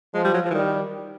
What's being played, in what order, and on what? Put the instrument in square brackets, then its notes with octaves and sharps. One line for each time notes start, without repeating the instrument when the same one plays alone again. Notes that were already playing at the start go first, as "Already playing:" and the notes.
[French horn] F3 [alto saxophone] G#3
[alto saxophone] G3
F#3
F3
E3
[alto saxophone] D#3 [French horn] G3